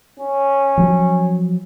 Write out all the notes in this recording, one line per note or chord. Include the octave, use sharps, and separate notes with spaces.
C#4
F3 F#3